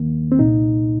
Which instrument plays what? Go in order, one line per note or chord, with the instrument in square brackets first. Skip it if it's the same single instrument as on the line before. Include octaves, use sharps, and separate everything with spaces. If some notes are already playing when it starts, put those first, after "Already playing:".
Already playing: [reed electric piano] D#2 D#3 A#3
C4
C2 A#2 D#4